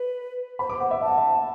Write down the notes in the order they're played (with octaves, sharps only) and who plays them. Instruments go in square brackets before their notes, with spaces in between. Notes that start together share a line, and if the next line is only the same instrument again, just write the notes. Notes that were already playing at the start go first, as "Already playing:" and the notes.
Already playing: [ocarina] B4
[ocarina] C5 [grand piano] B5
[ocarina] B4 [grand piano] D6
[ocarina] C5 [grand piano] F#5
[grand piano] E5
[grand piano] E5 [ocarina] A5
[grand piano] F#5
E5